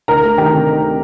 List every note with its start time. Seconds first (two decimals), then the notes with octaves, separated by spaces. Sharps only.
0.08 D2 A#4 A#5
0.23 A3
0.38 D#3 G4 G5
0.53 C3